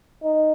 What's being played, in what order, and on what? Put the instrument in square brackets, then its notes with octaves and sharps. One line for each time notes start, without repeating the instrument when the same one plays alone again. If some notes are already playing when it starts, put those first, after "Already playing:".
[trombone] D#4